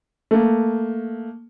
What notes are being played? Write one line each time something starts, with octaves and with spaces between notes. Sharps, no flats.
A3 A#3